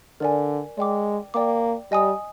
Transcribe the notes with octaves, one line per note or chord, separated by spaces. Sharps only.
D3 A#4 D5 G#5
G#3 D5 G5 D6
A#3 D5 G5 D6
G3 D#5 G#5 D#6